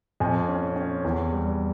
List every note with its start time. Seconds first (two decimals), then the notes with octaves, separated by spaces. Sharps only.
0.20 F2 G#5
0.49 C#4
0.76 C#4
1.04 E2
1.32 G3